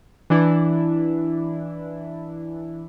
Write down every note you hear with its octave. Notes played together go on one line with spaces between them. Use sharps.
E3 D4 E4